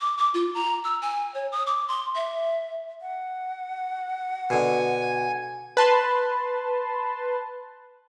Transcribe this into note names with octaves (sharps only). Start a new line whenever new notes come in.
D6
D6
F4
A#5
E6
G#5
C#5
D#6
D6
C6
E5
F#5
B2 D3 G#5
B4 A5 C6